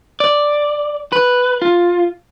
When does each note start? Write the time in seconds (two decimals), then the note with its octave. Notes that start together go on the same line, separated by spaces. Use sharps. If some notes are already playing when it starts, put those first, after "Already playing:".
0.20 D5
1.12 B4
1.62 F4